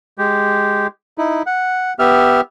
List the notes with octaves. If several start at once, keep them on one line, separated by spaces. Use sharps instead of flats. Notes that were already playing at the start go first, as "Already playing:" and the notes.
G#3 G4
D#4 E4
F#5
B3 G4 E5 F6